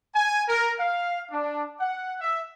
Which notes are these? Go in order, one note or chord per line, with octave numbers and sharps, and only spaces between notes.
G#5
A#4
F5
D4
F#5
E5